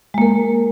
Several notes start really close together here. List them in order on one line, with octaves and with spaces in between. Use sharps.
G#3 A#3 A#4